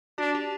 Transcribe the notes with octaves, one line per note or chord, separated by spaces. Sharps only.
D4 F#4
G4